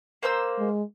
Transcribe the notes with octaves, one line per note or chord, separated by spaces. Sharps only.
A#3 C5 E6
G#3